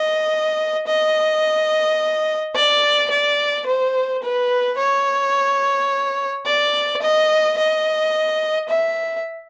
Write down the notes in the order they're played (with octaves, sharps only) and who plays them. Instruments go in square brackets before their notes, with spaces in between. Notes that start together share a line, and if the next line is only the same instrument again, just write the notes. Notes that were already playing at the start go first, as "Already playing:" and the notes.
Already playing: [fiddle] D#5
D#5
D5
D5
C5
B4
C#5
D5
D#5
D#5
E5